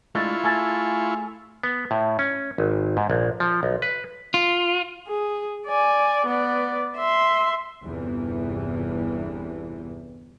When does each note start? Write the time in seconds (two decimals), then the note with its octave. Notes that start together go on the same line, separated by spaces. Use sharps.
0.15 G#3 A3 D4 E4 F4 C#6
0.44 A3 G#4 A4
1.63 B3
1.91 A2
2.19 C#4
2.58 G#1
2.97 G#2
3.10 A#1
3.40 F3
3.63 B1
3.82 B4
4.34 F4
5.08 G#4
5.67 D5 G#5
6.26 B3 D5
6.97 E5 C6
7.83 G1 E2 G2 C3 E3